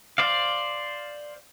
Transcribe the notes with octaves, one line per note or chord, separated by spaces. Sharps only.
C5 D5 F5